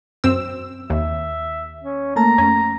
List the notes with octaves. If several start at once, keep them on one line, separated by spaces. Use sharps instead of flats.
F#2 C4 E6
D#2 E5
C#4
A3 A#3 A5 A#5
F2 A3 C#4